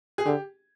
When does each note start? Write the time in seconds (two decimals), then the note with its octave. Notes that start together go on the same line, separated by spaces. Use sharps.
0.18 G#4
0.25 D3 G4